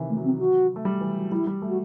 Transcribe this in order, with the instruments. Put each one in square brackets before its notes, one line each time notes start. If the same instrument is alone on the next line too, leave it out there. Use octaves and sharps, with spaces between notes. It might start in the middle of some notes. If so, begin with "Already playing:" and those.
Already playing: [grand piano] C3 D#3 E3
[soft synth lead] A3
[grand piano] F#3
[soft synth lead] C4
F#4
[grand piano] A3
G3
E3
F#3
[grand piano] G3 [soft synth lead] E4
[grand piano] G3
A3
[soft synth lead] F#4